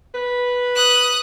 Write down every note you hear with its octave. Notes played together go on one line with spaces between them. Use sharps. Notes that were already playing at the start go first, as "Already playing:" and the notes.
B4
D#6 F#6